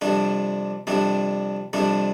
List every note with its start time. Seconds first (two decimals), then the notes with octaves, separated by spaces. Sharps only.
0.01 F2 C3 G3 D4
0.87 F2 C3 G3 D4
1.73 F2 C3 G3 D4